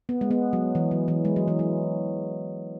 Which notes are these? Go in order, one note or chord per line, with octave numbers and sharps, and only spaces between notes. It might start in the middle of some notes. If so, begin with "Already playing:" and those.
B3
G#3
B3
F#3
E3
F#3
E3
G#3
F#3
E3
F#3